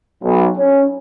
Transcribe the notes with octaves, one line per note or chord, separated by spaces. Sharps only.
B1
C#4